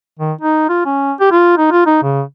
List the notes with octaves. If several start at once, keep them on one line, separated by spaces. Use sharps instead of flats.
D#3
D#4
F4
C#4
G4
F4
D#4
F4
D#4
C#3